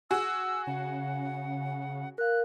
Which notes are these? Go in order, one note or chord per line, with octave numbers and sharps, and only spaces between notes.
F#4 G#4 E6
C#3 F#5
A#4 F5 F#6